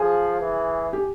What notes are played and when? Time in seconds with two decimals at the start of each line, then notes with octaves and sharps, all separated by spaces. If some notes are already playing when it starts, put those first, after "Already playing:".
Already playing: F3 G#4
0.40 E3
0.93 G4